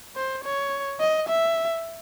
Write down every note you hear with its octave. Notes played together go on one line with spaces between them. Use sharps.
C5
C#5
D#5
E5